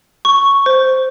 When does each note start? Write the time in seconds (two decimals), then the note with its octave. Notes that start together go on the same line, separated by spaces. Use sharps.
0.25 C#6
0.66 C5